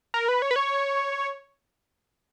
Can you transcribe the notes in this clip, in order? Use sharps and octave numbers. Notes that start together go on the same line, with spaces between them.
A#4
B4
C#5
B4
C#5